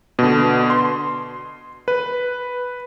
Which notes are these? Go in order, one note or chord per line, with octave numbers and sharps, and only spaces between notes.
B2 D3
C6
B4